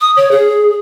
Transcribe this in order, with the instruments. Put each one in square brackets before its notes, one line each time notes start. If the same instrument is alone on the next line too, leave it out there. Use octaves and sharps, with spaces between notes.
[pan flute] D#6
C#5
G#4